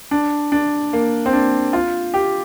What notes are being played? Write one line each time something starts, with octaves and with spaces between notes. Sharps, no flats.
D4
D4
A#3
C4
D4
F4
G4